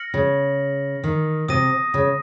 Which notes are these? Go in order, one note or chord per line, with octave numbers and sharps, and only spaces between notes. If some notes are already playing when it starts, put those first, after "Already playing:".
Already playing: F6 A#6 C#7 F#7
C#3
D#3
C3 D#6 A#6 D#7
C#3